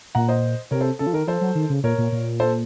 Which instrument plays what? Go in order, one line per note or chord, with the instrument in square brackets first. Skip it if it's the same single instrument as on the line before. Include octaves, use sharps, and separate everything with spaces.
[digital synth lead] A#2 [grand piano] F#5 A#5
[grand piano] C5 D#5
[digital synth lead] C3 [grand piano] A#4 C#5
[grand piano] A4 C5
[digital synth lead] C#3 [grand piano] A4
[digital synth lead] F3
[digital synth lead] D#3 [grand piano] A#4
[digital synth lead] F3 [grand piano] A4 C5
[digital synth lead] F#3
D#3
C#3
[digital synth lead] A#2 [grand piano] A#4 C#5
[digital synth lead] A#2
A#2
[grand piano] A4 C5